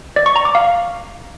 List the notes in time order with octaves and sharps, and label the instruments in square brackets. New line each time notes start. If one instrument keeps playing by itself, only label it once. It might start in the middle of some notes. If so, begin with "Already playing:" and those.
[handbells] D5
C#6
A#5
D6
F5